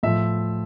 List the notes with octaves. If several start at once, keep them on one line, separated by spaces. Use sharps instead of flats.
A2 F3 E5